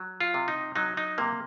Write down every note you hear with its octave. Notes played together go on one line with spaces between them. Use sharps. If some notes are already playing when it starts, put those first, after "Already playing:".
Already playing: F#3
F4
C3
D#4
F#3 D#4
D#4
C3 A#3